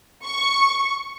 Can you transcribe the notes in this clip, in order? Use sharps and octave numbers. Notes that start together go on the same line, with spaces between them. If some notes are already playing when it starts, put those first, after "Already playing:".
C#6